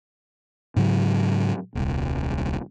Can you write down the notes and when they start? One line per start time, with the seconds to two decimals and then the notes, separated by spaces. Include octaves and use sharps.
0.76 G#2 C#3 F#3
1.75 D#1 C2